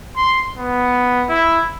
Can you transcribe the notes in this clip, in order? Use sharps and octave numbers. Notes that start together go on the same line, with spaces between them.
C6
B3
E4